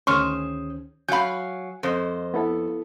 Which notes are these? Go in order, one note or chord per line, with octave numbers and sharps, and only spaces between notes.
D2 D#3 C#4 G#4 C5 C6 C#6 F6
F#3 F5 G#5 B5 G6
F2 A4 C5 D#5
B3 E4 A4